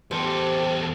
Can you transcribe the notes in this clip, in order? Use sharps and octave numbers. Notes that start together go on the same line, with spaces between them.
E2 G4 A4 C5